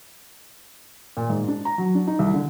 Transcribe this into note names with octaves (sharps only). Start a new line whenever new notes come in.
A#2
G#2
D4
A#5
F#3
D4
D#4
C2
D3